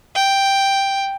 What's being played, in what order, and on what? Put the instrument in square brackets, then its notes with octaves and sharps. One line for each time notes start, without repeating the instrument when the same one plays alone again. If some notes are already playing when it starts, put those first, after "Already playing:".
[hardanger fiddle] G5